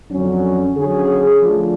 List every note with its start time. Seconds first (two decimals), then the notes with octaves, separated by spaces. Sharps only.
0.12 F2 D3 F#3 C#4
0.77 D3 F#3 C#4 G#4
1.43 F3 A3 D4 F4